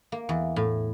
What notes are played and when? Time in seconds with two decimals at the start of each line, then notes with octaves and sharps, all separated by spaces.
0.12 A#3
0.29 E2
0.56 A2